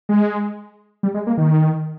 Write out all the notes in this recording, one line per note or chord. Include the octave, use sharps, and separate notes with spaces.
G#3
G3
G#3
A#3
D#3